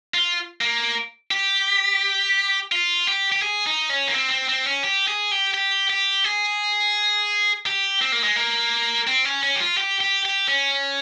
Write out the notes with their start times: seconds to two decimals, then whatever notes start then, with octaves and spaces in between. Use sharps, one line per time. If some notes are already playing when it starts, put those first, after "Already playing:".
0.14 F4
0.61 A#3
1.31 G4
2.72 F4
3.07 G4
3.32 G4
3.42 G#4
3.67 D#4
3.89 C#4
4.08 A#3
4.14 C4
4.30 C4
4.49 C4
4.66 C#4
4.83 G4
5.08 G#4
5.32 G4
5.54 G4
5.90 G4
6.24 G#4
7.66 G4
8.02 C4
8.12 A#3
8.23 G#3
8.36 A#3
9.07 C4
9.25 C#4
9.43 C#4
9.56 G4
9.60 F4
9.77 G4
10.01 G4
10.25 G4
10.48 C#4